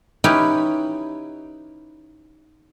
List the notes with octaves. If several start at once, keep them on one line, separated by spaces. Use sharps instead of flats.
C#4 D#4 E4 G4 B4